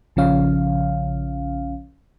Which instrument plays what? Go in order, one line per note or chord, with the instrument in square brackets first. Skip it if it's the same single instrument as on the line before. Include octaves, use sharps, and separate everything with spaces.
[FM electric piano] A#1 C#3 F3 C#4 F5